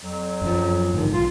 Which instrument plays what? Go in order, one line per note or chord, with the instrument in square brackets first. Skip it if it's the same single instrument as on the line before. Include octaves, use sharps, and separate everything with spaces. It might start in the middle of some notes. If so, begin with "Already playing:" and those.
[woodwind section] F2 F#3
[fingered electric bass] F#2 F3
G#2 D3 D#3
[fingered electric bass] B1 [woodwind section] F4